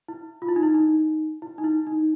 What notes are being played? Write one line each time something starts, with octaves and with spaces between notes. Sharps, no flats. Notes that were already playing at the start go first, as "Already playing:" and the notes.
E4
F4
E4
D#4
E4
D#4
E4
D#4
E4
D#4